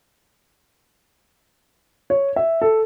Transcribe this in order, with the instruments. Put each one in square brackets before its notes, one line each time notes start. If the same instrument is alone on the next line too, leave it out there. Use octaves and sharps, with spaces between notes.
[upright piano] C#5
E5
A4